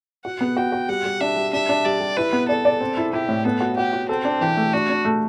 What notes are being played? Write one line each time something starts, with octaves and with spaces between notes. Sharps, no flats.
F#4 F#5
B3
F#4 G5
F#4
G3 F#5
G3
D4 E5
G3
D4 E5
D4
G3 D5
G3
E4 B4
B3
A4 D5
D5
C4
E4
E4 G4
A2
B3 A4
F#4
F#4 G4
F#4
C4 A4
D4
E3 G4
A3
D4 F#4
D4
A3